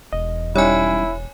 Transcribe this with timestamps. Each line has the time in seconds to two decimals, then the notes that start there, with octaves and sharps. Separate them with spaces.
0.13 E1 D#5
0.56 G3 C#4 D#4 E4 C#5 G#5